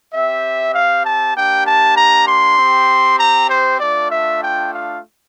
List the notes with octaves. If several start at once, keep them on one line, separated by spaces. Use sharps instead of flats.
C4 G4 E5
F5
A5
A#3 D4 G4 G5
A5
A#5
C6
C4 G4
A#5
C5
A3 D4 F4 D5
E5
G5
F5